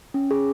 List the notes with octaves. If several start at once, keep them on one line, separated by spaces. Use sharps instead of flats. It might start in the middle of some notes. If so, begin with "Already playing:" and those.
C#4
G#4